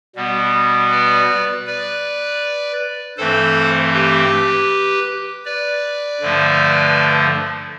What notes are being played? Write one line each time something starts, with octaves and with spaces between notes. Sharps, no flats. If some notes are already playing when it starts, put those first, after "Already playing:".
B2 G3 B3
B4 D5
B4 D5
G2 E3 A3 C4 A4 C5
G4 B4
B4 D5
G2 D3 F3 A3